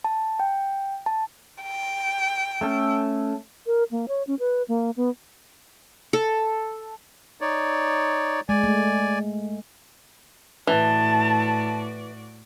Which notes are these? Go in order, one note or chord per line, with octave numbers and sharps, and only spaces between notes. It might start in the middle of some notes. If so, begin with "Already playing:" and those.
A5
G5
A5
G5
A3 C#4 A4
A#4
A#3
C#5
C#4
B4
A#3
B3
A4
D#4 C#5 D5
G#3 D5 G#5
A3
A2 E3 F#4 D5 A5